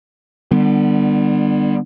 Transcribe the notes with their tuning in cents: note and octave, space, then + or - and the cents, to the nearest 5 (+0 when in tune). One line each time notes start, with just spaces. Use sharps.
D3 +35 G3 +10 B3 -5